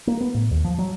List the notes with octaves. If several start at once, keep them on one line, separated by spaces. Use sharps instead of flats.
A#3
B3
A2
D#2
F3
F#3